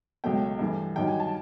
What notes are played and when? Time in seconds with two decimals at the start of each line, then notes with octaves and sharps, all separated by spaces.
0.24 C#2 B2 F#3 A3 G5
0.59 G2 E3 A3
0.96 G2 D#3 F#3 G5
1.07 G#5
1.20 A5